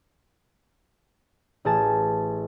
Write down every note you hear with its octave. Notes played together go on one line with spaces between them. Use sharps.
A1 G#4 A5